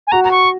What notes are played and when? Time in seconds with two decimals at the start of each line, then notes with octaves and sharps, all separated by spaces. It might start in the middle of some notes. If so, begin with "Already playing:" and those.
0.07 G#5
0.12 F#4 A#5
0.24 A#5
0.31 C#6